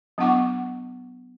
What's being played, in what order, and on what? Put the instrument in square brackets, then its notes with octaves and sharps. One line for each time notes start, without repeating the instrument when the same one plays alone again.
[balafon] F#3 B3 D4 F#5 C#6 D6